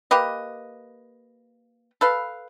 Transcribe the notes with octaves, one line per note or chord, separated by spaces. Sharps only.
A#3 G4 B4 D#5
A4 B4 F5